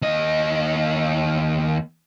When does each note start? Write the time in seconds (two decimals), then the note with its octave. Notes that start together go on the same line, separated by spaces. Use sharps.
0.02 D#2 D#5